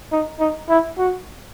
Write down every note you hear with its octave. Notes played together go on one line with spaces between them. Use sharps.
D#4
D#4
E4
F#4